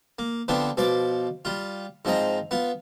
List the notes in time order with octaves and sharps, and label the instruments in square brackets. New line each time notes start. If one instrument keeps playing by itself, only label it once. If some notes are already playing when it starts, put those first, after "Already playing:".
[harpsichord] A#3
D3 F3 B3 C4 D4
B2 F3 D5 D6
G3 F4
G#2 F3 C4 D#5 A#5
B3 F4